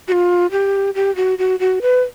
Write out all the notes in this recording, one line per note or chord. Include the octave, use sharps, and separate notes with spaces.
F#4
F4
G4
G4
F#4
F#4
F#4
B4